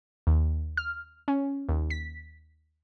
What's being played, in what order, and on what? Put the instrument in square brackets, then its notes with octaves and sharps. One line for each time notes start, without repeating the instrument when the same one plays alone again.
[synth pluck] D#2
F6
C#4
D#2
B6